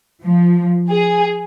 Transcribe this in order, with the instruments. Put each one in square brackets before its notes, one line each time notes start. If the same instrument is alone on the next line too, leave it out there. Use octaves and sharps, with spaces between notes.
[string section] F3
G#4